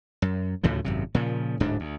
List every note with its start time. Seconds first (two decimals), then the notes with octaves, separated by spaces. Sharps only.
0.22 F#2
0.63 D2 A2 C#3 F3
0.85 G#1 F#2 C3
1.15 A#2 C#3 F3
1.60 D1 G#2 D4
1.80 D2